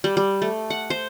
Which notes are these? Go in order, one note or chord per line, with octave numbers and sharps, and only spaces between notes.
G3
G3
A3
F#5
C5